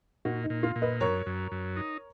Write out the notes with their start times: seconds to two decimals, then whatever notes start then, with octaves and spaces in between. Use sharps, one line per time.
0.25 A#2 D#4 F#4
0.44 D#4
0.50 A#2
0.63 F4
0.76 A#2
0.82 B4 D#5
1.00 F#2 A#4 C#5
1.26 F#2
1.51 F#2
1.76 D#4